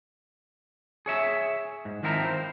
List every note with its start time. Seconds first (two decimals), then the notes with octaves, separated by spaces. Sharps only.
1.06 G#4 C#5 E5
1.85 G#2
2.03 D#3 F3 C4 E4 A#4 A#5
2.25 C5